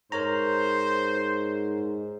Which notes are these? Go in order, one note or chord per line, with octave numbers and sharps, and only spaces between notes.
G#2 A#4 C5 C#5 A#5